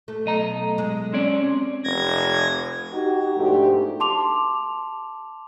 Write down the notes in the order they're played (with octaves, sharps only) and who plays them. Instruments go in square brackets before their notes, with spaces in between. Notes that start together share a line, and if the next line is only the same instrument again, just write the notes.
[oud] A3
[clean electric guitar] B1 D#5 A#5
[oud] G#3
[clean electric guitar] C4 C#4 D5
[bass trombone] F1 [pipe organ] G#6 A#6
[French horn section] D#4 F#4 G4
G#2 B2 F3 A3 D4 G4
[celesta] A5 C6 D6 F7